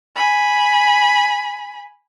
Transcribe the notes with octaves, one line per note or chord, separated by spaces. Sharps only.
G#5 B5